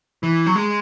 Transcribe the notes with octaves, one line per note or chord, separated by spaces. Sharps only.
E3
F#3
G#3